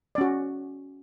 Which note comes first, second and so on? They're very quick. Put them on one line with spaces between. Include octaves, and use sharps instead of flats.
D5 C#4 F#4